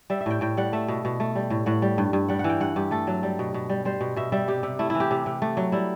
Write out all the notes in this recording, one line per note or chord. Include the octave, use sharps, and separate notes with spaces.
G3 E5
E5
A2 G5
A2 G5
G3 F#5
A3 E5
B2
B2
A3
G3
A2
A2 F#5
G3
G2
G2
G3 F#5
F#5
E3
G5
G2 F#5
G2 G4
A3 A4
F#3
G3
B2
B2
G3
G3 C5
B2
B2 E5
G3 E5
C3 G4
C3
A3 E4
E3 E4
G4
C3
C3
A3
F#3
G3 E4